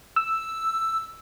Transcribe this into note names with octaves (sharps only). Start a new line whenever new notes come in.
E6